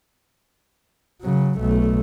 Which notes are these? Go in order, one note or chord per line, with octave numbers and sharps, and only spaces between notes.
C#3 F#3
B1 A3